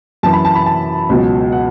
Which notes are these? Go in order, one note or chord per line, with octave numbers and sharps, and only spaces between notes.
F#2 E3 A5
B5
A5
B5
A5
C#2 B2 F#3
F#5